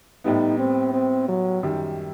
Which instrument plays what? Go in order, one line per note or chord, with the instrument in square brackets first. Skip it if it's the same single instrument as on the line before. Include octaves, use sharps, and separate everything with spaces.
[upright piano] A2 G3 B3 [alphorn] D#4
[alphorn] C4
C4
F#3
[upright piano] F#2 D#3 G3